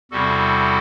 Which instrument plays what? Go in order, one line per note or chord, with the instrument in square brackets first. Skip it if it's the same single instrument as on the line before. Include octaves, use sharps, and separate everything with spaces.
[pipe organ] E2 C3 G3 C4 E4 F#4 A4